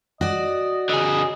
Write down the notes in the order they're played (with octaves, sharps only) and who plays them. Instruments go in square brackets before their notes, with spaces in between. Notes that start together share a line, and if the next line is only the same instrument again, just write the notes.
[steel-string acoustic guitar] F#4 D5 [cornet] D#5
[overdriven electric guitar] D3 G#4 [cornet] D#5